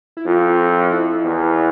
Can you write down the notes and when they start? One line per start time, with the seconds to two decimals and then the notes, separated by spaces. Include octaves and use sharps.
0.17 E4
0.26 F2 F4
0.92 E4
1.25 E2